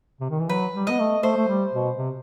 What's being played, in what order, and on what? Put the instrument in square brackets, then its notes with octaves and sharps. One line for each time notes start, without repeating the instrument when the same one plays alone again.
[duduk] C3
D#3
E3
[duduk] F#3 [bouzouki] B4
[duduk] G3
[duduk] B3 [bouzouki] D#5
[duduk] A3
[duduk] A3 [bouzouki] C5
[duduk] A3
G3
B2
C3